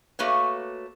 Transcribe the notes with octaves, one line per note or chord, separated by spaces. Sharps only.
A3 A#3 F#4 B4 C#5